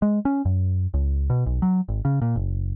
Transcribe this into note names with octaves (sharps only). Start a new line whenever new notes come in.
G#3
C#4
F#2
C#2
B2
B1
F#3
G#1
C#3
A#2
F#1